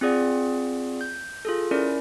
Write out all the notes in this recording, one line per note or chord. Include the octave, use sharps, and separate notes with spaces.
C4 F4 G#4 D5 F#5
G6
F4 G#4 A4
C#4 E4 A#4 D5